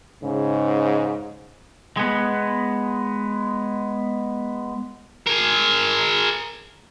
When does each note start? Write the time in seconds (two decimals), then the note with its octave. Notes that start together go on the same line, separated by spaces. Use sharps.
0.24 G#2 C#3
1.97 G#3 B3
5.27 G#4 A#4